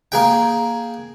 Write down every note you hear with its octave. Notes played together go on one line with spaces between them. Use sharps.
A#3 G#4 G5